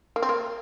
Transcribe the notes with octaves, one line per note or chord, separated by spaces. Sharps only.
A#3
C4
A#3